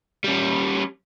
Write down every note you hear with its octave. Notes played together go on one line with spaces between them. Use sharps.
G3 C#4